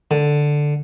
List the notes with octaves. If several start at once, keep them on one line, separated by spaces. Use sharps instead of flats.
D3